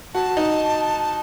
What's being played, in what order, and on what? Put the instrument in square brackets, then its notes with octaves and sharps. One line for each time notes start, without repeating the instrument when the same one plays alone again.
[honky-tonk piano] F#4 [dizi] A5
[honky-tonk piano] D#4